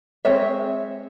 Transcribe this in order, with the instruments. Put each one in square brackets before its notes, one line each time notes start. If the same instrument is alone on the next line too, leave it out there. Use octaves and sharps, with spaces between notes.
[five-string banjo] G#3 C4 C#5 E5